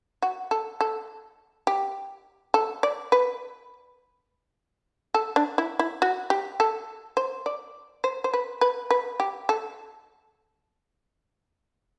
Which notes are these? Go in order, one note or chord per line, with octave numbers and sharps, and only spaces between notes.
F#4
A4
A4
G4
A4
D5
B4
A4
D4
E4
E4
F#4
G4
A4
C5
D5
C5
C5
B4
B4
B4
G4
A4